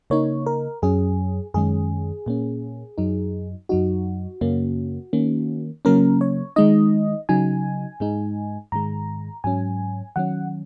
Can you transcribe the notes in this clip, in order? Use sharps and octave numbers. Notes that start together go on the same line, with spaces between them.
C#3 A#3 D#4 C#5
A#4
F#2 F#3 C#4 G#4
F#2 D#3 G#3 C#4 G#4
A#2 A#3 C#4
F#2 F#3 D#4
F#2 F#3 D#4 F#4
F#2 C#3 A#3 C#4
D#3 A#3 C#4
C#3 F#3 A#3 C#4 A#4
C#5
D#3 G#3 D#4 D#5
C#3 F#3 D#4 G#5
G#2 G#3 D#4
G#2 D#3 G#3 A#5
G#2 F#3 C#4 G#5
D#3 F#3 C#4 F#5